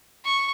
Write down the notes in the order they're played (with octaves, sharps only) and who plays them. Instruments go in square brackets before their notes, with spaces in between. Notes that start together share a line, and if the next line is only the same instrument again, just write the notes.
[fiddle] C#6